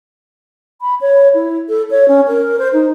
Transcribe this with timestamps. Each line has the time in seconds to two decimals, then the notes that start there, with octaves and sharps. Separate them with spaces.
0.81 B5
1.01 C#5
1.34 E4
1.69 A4
1.91 C#5
2.08 C#4
2.27 A#4
2.59 C5
2.73 D#4